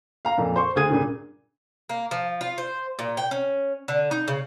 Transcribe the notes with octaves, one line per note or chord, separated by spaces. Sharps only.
F5 A#5
F2 A#2
C5 C6 C#6
D2 G#4 D#6 G#6 D#7
G2 A#2 C#3
A#3
F3
F4
C5
A#2
G5
C#4
D3
D#4
C#3